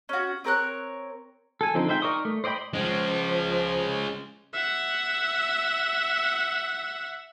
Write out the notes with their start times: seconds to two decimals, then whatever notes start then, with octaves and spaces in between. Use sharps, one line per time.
0.09 C#4 F#4
0.44 C4 A#4 C#5 F#6
1.61 A4 G#5
1.74 D3 F3 C4 D#4 A4
1.88 G#3 D#4 C5 E5 G5
2.02 D#4 A#4 D5 C#6 D#6
2.25 A3
2.44 C5 D5 D#5 G5 B5
2.74 F3 G#3 C#4
4.53 E5 F#5